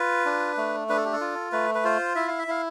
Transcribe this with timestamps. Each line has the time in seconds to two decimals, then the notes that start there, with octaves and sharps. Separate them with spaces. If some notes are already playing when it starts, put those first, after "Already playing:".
Already playing: F4 B4
0.25 D4
0.57 A3
0.89 D4 B4
0.97 A4
1.05 G4
1.13 A4
1.21 F4
1.52 A3 B4
1.75 B4
1.84 F4 C5
2.15 E4 E5
2.28 F5
2.39 E5
2.48 E4 F5